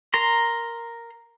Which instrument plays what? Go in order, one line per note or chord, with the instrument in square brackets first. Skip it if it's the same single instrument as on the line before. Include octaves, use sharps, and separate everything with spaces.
[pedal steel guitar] A#4 A#5 C6